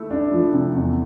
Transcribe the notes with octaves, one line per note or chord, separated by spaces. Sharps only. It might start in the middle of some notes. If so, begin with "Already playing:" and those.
Already playing: A3 E4
D4
F3
C3
E2